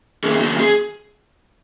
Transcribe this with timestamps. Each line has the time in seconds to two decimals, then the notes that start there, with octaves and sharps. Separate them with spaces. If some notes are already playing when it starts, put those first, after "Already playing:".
0.24 D#3 A#3 C#4 G#4
0.41 F#4
0.59 G#4